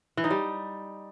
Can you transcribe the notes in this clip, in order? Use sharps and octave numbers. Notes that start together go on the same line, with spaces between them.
E3
D#4
G3